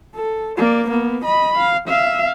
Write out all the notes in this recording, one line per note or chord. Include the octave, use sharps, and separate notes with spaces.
A4
A#3 D5
A#3 B3
D#5 B5
F5
E5 F5